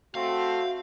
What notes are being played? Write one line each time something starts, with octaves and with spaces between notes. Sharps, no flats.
A3 C4 F#4 F5